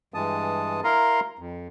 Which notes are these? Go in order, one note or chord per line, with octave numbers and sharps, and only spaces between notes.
G2 E3 G#3 A5 D#6
E4 A#4 F5 A#5 C6
F2